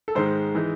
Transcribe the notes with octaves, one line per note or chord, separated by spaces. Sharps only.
A4
G#2 D#3 G#3 C5
E3 G#3 D#4